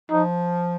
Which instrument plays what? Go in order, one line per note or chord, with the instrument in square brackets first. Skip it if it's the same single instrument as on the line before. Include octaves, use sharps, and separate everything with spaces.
[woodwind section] F3 [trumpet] D#4